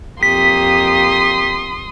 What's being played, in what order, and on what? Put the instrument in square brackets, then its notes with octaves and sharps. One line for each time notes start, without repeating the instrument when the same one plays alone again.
[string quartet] F2 A#3 G4 [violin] C6 D#6 [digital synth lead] B6